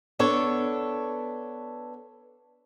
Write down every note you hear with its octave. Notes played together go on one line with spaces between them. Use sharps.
B3 D4 A4 C#5